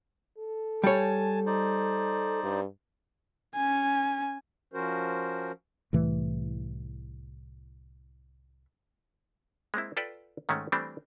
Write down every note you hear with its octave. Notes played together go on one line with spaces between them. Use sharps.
A4
G3 C#5 G#5 A5
D#4 C5 D5
G2
C#4 G#5
F3 C#4 F#4 A#4 C5
C2 A2 E3 A3
G#3 A#3 C4 E4
F4 A4 B4 D5 G5
G#2 D#3 G#3 A3 C#4
E3 G3 A3 C4 D4